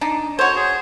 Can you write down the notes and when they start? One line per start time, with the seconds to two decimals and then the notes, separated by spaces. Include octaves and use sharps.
0.01 D4 D#4
0.39 F#4 C5 C#5
0.56 G#4